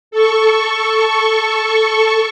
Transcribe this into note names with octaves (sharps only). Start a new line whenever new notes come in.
A4 C#6